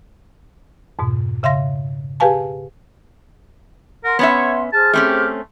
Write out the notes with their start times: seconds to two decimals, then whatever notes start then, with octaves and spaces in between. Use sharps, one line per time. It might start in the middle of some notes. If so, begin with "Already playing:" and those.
0.99 F2 G#2 B2
1.43 C#3 E5 F5 C6 A#6
2.20 G4 G#4 B4 F5 G#5 A5
4.04 A#4 F#5 C6
4.19 B3 C#4 C#5 E5
4.73 G#4 C5 A5 F6
4.93 A3 C4 C#4 G4